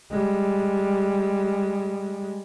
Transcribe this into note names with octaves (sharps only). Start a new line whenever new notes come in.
G3 G#3